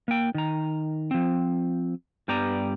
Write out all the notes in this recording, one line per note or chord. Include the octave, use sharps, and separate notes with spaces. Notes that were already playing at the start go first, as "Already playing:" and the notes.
A#3 G5
D#3 A#5
F3 C4
G2 G3 B3 G4 D5 A#5